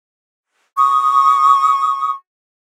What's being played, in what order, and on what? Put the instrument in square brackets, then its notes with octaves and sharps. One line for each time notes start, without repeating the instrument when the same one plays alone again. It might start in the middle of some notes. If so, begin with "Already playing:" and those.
[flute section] C#6 D#6